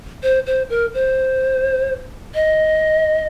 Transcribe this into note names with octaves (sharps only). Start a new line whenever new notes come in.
C5
C5
A#4
C5
D#5